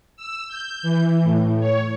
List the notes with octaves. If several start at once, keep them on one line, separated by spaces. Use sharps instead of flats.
E6
G6
E3
A2
C#5